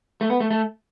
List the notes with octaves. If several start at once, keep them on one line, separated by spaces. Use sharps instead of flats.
A3
B3
A3
A3